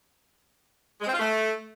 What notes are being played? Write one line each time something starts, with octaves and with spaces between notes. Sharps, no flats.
G#3
C4
F4
A3